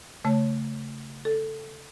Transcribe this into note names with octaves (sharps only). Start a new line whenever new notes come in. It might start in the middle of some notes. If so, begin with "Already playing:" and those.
C#3 A3 C#5 A5
A4